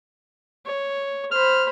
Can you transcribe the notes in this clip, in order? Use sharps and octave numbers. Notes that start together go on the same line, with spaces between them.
C#5
C5 B5 F6